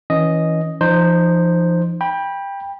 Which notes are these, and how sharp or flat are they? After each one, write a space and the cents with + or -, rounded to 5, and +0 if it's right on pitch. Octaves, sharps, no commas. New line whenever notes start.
E3 -20 C#4 +0 D#5 +0
F3 -40 D#4 -25 C5 +0
G5 +20 B5 -20